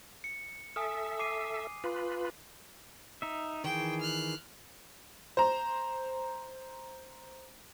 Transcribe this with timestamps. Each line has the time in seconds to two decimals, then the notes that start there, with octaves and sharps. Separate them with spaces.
0.24 C#7
0.76 A4 E5 G#5 D#6 F6
1.19 D6 C7 D#7
1.84 F4 B4
3.22 D#4 E5
3.64 D#3 E3 G#4 G5
4.01 F6 F#6
5.37 C5 A#5